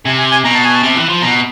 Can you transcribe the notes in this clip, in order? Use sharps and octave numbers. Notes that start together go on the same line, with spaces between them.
C3 G#5
G#5
G#5
B2 A#5
A5
G#5
A5
C3
E3
F3
B2 A#5